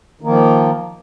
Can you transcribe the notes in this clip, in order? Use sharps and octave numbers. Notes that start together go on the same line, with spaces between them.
D#3 F3 A#3